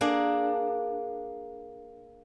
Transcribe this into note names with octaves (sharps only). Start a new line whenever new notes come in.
A#3 D4 G#4